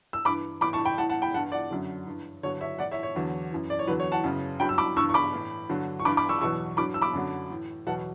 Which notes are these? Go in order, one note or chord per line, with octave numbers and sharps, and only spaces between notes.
E6
G2 E3 B5 D6
A2 E3 B5 D6
A5 C#6
G5 B5
A2 E3 F#5 A5
F#5 A5
G5 B5
G2 E3 F#5 A5
D5 F#5
F#2 D3 F#3
G2 E3
G2 D3 F#3 C#5
C#5 E5
A2 E3 D5 F#5
C#5 E5
C#5
E2 D3 F#3
F#2 E3
D5
C#5
E2 D3 F#3 B4
C#5
F#5 A5
F#2 C#3 E3
G2 F#3 G5 B5
E6
B5 D6
G2 E3 C#6 E6
C#6
B5 D6
A2 E3
G2 D3 F#3
C#6
G2 E3 B5 D6
B5 D6
C#6 E6
E2 B2 F#3 C#6 E6
G2 F#3 B5 D6
E6
B5 D6
F#2 D3 F#3
A2 E3
E2 B2 F#3 F#5 A5